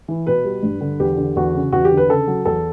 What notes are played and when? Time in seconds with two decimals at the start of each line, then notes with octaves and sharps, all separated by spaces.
0.08 E3
0.27 B2 B4
0.44 G3
0.63 G2
0.81 D3
1.00 E2 G4
1.17 D3
1.36 E2 F#4
1.54 C#3
1.72 E2 F#4
1.85 G4
1.91 D3
1.97 B4
2.09 C#3 A4
2.28 F#3
2.45 E2 A4